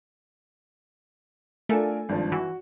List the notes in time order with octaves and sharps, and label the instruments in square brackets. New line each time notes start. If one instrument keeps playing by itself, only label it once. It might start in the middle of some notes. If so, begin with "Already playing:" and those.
[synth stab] A3 A4 G#5 [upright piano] D4 F4 A#4
[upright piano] G#1 G2 F3
[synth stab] E3 [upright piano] F#4